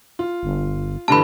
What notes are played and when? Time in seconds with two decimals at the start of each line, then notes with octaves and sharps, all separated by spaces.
0.19 F4
0.43 G1
1.08 G2 D3 E3 A5 B5